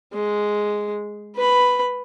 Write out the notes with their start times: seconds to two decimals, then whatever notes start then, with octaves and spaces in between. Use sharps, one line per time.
0.13 G#3
1.35 B4 B5